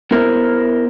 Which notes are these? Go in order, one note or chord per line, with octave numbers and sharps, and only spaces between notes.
B3 E4 A#4 C5